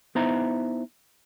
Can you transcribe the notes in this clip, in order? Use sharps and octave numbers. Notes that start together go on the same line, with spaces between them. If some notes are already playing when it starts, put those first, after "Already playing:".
B3 D#4 E4 C5 E5 A#5